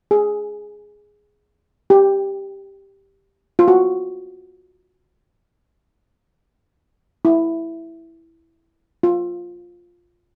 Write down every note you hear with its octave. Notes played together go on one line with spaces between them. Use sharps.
G#4
G4
F4
F#4
E4
F4